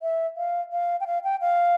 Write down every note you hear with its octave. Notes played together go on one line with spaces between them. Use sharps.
E5
F5
F5
G5
F5
G5
F5